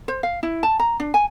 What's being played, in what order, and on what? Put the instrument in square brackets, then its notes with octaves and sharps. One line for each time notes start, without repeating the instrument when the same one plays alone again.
[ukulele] C5
F5
E4
A5
A#5
D4
G#5